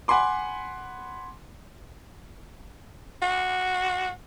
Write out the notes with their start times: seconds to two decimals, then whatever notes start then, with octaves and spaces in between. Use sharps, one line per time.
0.08 F#5 G#5 B5 C6 D6
3.22 F#4